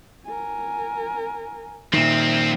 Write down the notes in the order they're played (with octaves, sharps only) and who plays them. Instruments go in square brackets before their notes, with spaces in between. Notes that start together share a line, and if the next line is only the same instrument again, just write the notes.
[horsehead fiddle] A#4 G#5
[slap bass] A#2 D#3 [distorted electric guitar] F3 C4 [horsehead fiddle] E5